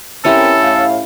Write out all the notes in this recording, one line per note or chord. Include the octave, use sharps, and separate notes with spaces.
C4 C#4 E4 G4 A4 A#4
A2 F5